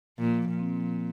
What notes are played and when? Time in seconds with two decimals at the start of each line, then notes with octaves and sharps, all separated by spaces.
0.18 A#2 F3
0.39 F3
0.49 A#2
0.59 C4
0.79 F3